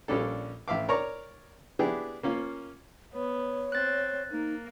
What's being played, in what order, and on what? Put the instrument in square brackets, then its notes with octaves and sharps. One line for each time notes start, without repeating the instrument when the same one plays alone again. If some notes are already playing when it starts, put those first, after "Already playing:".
[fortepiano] A#1 G3 C#4 D4 A4
A1 E5 F5 D6
A#4 C#5 D5 A#5 C#6
B3 D4 E4 G4 G#4
A#3 C#4 F4
[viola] B3 [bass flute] C#5
[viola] C4 [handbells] F#6 A6
[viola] A#3 [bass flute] D#4